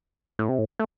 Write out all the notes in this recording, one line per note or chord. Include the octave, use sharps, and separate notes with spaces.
A2
C3
A2
A3